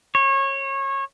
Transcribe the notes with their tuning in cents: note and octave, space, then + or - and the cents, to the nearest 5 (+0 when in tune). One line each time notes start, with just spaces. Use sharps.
C#5 -25